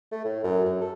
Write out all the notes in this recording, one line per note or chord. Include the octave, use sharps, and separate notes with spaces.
A3
A2
F#2
F#2
A4